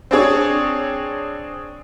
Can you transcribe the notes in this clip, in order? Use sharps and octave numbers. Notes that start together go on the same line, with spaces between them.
C4 D4 G#4 C#5